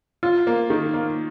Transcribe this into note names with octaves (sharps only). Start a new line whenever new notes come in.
F4
A#3
D#3
A#3